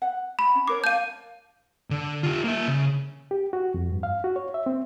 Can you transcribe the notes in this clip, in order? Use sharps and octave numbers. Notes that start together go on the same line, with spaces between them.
F#5
B5
C#4
D4 A#4 C#5 D6
F5 A5 G6 D#7
D3
F4 G4
A#3 E5
C#3
G4
F#4
F2
G2
F5
F#4
C#5
E5
C4